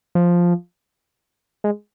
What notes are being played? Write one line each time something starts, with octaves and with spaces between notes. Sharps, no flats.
F3
G#3